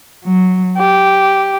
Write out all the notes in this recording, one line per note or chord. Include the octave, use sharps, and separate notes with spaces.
F#3
G4